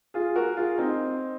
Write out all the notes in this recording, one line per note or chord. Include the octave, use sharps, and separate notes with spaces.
F4 G#4
F#4 A#4
F4 G#4
C4 D#4